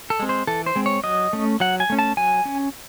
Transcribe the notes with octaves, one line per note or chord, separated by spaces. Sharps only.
A4
G#3 C4
C5
E3 A4
C5
G#3 C4
C#5
F#3 D#5
A3 C#4
F#3 F#5
G#5
A3 C#4
A5
F#3 G#5
C#4